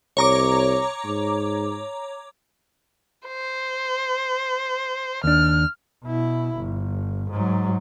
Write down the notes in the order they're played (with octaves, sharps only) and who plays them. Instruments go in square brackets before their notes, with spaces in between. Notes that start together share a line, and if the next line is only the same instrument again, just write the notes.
[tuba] C2 [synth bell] C#5 A#5 D6
[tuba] G#2
[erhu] C5
[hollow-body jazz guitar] D#2 D4 [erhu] F6
[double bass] B2 E4
G1
G#2 F#3